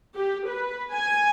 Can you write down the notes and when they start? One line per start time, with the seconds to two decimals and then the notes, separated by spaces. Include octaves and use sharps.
0.15 G4
0.48 B4
0.93 G#5